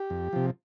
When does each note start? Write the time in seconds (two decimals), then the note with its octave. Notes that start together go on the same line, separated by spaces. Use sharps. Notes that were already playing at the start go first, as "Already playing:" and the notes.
Already playing: G4
0.10 F2
0.33 C3 F3